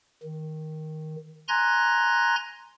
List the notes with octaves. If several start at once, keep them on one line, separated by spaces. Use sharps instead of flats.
D#3
G#5 A#5 C6 F#6 G#6 A#6